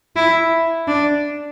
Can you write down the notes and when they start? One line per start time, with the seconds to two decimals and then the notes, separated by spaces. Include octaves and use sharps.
0.16 E4
0.88 D4